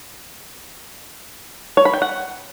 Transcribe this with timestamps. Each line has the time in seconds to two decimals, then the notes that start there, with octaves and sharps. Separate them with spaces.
1.77 C#5
1.85 B5
1.94 G5
2.02 F#5